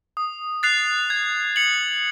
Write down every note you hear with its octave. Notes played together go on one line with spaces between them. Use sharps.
D#6
F#6 A6 C7 F7
G#6
C#7 F#7